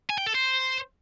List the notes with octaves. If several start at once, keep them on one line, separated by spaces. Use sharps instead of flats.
G#5
G5
A4
C5